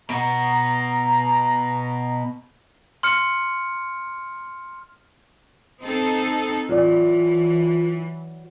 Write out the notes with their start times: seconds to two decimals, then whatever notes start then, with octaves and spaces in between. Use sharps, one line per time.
0.10 B2 F#4 A#5
3.03 C6 F6 C#7
5.82 C4 D#4 A4
6.69 E3 F#3 F4 D5